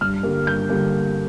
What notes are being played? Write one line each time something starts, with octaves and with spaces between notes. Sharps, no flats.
G2 F6
D3 G3 A#3
G2 G6
D3 G3 A#3